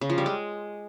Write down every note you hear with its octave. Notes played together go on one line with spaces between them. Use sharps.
C#3
F3
G3
G#3